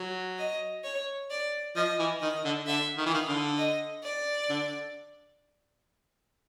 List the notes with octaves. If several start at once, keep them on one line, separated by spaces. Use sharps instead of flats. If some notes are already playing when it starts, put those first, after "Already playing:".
Already playing: F#3
D#5
C#5
D5
F3 D#5
E3
D#3 D#5
D3
D3 E5
D#3
E3
D#3 F5
D3
D#5
D5
D3